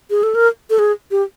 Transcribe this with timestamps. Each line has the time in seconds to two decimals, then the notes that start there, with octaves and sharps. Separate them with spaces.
0.10 G#4
0.23 A4
0.35 A#4
0.70 A4
0.79 G#4
1.11 G4